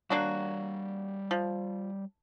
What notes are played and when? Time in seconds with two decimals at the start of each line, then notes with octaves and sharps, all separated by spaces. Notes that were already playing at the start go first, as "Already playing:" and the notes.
0.10 G3 A#3 D4 F#4 C#5
1.31 F3